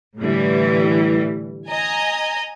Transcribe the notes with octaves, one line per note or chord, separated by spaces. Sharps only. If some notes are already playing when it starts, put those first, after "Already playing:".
A2 D3 E3 G3
D#5 G#5 A#5